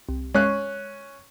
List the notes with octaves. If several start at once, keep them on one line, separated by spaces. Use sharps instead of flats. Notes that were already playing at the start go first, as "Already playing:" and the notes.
C2
G#3 C#4 C#6 F#6 C7